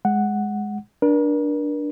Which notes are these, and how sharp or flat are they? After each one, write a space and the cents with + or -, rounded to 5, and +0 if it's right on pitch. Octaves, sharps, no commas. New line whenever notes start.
G#3 +0 F#5 +0
D4 +0 A#4 +40